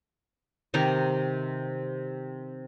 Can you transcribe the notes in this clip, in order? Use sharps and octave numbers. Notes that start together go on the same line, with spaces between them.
C3 D#3 G4 A#5